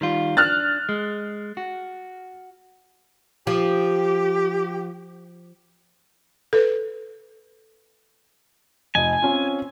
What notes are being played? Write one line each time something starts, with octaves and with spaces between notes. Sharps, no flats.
D#3 G3 F4
D4 F6 F#6 A6
G#3
F#4
F3 G4
A4 B4
F1 D#5 G#5 A5
C4 C#4 F4